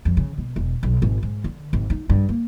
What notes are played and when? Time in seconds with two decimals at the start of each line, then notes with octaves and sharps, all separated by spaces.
0.05 F2
0.17 C#3
0.38 B2
0.56 E1
0.83 B1
1.02 G#1
1.23 G#2
1.44 D3
1.73 G#1
1.90 D#4
2.10 G2
2.29 A#3